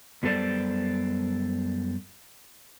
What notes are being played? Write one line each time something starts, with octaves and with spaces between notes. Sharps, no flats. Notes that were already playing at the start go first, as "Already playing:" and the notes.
F#2 G3 B3 A4 C5 D5